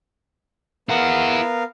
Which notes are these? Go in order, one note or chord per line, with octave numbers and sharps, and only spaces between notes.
B3 E4 A#4 F5 F#5